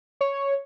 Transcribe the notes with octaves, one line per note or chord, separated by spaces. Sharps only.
C#5